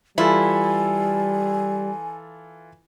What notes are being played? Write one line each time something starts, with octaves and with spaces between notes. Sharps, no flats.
E3 G3 E4 F4 A4 G#5